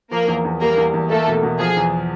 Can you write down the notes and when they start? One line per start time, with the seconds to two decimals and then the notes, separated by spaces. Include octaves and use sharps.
0.11 F3 A#3 A#4
0.28 E2
0.45 E2
0.61 G3 A#3 A#4
0.77 E2
0.94 E2
1.10 A3 A#3 A4
1.27 B2
1.43 B2
1.59 F3 G#4
1.76 E2